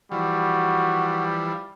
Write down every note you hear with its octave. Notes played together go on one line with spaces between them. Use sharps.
E3 F3 G3 F#4